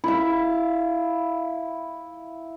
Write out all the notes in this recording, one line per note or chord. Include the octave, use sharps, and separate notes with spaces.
E4 F5